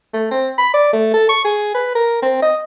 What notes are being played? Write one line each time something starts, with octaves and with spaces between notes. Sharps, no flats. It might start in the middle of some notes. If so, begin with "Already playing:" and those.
A3
C4
B5
D5
A3
A4
C#6
G#4
B4
A#4
C4
D#5